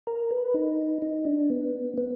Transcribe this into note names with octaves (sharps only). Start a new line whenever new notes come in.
A#4
B4
D#4
D#4
D4
B3
B3